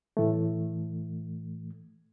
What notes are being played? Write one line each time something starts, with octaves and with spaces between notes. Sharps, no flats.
A2 E3 A3